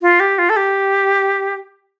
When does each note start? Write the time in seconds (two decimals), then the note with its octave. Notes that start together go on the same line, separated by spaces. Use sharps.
0.02 F4
0.20 G4
0.38 F4
0.50 A4
0.57 G4